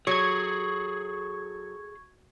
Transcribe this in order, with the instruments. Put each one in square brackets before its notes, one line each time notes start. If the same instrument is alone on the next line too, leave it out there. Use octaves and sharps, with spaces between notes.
[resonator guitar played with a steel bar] F#3 [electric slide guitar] G#4 A4 [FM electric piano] C#6 G#6